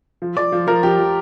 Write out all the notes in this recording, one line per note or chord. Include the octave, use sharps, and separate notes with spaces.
F3
F3 D5
F3
F3 A#4
F3 G4
F3